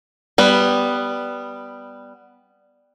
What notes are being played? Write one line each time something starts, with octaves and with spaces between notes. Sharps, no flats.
G3 B3